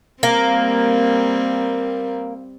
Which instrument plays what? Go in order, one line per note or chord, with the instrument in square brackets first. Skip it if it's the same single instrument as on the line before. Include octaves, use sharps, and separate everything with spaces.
[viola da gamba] G3 C4 [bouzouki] A#3